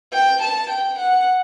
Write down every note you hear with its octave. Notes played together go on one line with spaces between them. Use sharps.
G5
A5
G5
F#5